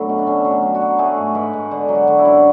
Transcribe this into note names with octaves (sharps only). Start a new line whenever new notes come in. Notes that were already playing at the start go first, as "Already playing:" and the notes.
Already playing: F#2 D3 F#3 A3 B3
B2
D4
A3 C#4
F#3
D4
F#3
F#4
F#3
A3 G#4
G#2
G#2 B4
G#2
D3
F#3
F#4
D3
E4
F#2